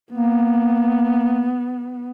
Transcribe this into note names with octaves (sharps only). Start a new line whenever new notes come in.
A#3 B3